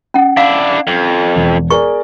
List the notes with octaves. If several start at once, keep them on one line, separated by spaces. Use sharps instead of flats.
C#4 F#5
D4 E4 F5
F2
E1
G#4 A#4 D5 C#6